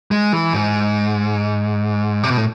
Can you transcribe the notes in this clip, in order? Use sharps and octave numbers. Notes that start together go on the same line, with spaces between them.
G#3
E3
G#2
C3
B2
A2